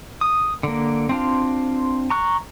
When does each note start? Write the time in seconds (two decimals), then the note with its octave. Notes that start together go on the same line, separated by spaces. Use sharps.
0.21 D#6
0.63 D3 A#3
1.09 C4 D4 F4
2.10 A#5 C#6 F#6